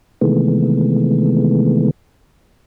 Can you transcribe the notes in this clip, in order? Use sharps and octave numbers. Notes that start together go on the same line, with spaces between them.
C3 D#3 E3 G#3 A3 B3